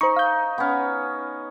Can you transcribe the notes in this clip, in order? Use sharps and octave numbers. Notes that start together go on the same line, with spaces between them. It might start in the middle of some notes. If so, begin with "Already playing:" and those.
D#4 C5 C#6
F5 G6
B3 C#4